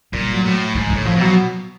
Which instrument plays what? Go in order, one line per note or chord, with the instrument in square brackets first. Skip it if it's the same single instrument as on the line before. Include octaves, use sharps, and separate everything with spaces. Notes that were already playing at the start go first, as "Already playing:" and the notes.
[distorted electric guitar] A#2 [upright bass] G3
[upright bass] F#3
[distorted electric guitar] A2
[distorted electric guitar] G#2 [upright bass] E3
[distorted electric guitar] A2 [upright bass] E3
[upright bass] F3
[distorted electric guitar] B2 [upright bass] F#3